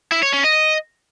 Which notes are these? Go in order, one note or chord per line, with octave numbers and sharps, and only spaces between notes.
E4
C#5
C#4
D#5